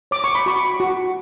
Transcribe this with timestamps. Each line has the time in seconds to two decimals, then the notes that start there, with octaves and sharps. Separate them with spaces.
0.11 C#5 D6
0.24 C#6
0.35 B5
0.46 F#4 C#6
0.80 F#4